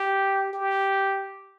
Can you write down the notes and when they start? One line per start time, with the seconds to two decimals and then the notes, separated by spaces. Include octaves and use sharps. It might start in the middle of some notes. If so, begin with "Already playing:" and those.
Already playing: G4
0.53 G4